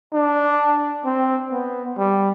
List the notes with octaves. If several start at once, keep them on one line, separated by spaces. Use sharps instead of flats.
D4
C4
B3
G3